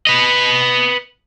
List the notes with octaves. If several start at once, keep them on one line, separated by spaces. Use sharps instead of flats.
B4 D#5